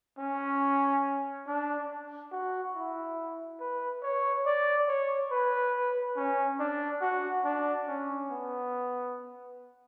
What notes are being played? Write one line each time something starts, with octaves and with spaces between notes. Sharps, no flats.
C#4
D4
F#4
E4
B4
C#5
D5
C#5
B4
C#4
D4
F#4
D4
C#4
B3